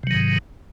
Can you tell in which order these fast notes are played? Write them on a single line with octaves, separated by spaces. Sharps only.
C3 F#3 D#3 G#2